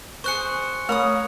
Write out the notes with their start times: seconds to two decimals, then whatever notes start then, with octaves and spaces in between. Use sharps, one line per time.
0.24 G#4 C5 C#6 F#6 C#7
0.89 A3 A#4 C#5 B5 D#6